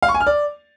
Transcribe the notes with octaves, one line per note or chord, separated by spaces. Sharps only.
F5
C#6
G#5
F6
D5